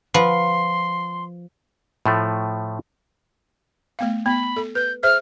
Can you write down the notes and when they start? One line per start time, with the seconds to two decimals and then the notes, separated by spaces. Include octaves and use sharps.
0.14 F3 B4 F#5 B5 C6
2.06 A2 F3 A3
3.99 A3 B3 F5
4.26 B3 B5
4.57 A4
4.75 B4 G6
5.03 G#4 C5 E5 F6